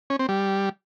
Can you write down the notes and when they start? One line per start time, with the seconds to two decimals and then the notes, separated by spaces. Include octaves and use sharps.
0.10 C#4
0.19 C4
0.29 G3